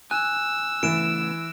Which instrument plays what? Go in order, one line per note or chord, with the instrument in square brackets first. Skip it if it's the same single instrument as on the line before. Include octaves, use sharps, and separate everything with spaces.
[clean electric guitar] G#5 [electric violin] E6 [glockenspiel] F#6
[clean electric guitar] C#3 A3 B3 [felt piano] E3 [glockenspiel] D7 E7